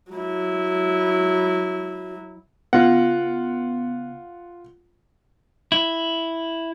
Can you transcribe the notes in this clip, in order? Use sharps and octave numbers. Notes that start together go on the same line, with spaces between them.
F#3 E4
C#3 B3 F4 F#5
E4